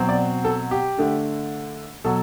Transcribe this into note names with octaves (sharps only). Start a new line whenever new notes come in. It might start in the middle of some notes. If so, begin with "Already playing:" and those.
Already playing: B2 F#3 C4
D5
A4
G4
D3 A3 D4
B2 F#3 A4